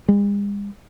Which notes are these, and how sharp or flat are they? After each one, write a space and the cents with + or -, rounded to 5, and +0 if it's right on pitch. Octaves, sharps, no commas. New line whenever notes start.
G#3 -45